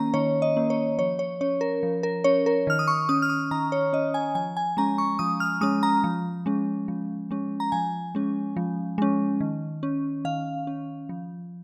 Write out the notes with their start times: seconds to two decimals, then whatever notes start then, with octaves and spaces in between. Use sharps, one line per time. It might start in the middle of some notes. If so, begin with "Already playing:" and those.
Already playing: D#3 A#3 C#4 A#5
0.14 D#3 C#5
0.42 D#5
0.57 A#3 C#4
0.70 C#5
0.99 F3 C#5
1.19 C#5
1.41 C#4 C#5
1.61 A#4
1.83 F3
2.03 A#4
2.24 C#4 C#5
2.46 A#4
2.67 D#3 F6
2.79 D#6
2.88 C#6
3.09 C#4 D#6
3.22 F6
3.30 D#6
3.51 D#3 A#5
3.72 C#5
3.93 C#4 D#5
4.14 G#5
4.35 F3 G#5
4.57 G#5
4.77 G#3 C#4 A#5
4.98 C#6
5.19 F3 D#6
5.40 F6
5.61 G#3 C#4 D#6
5.83 A#5
6.04 F3
6.46 G#3 C#4
6.88 F3
7.31 G#3 C#4
7.60 A#5
7.72 F3 G#5
8.15 G#3 C#4
8.56 F3
8.98 G#3 C#4
9.41 D#3
9.83 C#4
10.25 D#3 F5
10.67 C#4
11.09 F3